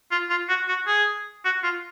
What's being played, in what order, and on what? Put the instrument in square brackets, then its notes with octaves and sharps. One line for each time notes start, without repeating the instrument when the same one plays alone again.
[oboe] F4
F4
F#4
F#4
G#4
F#4
F4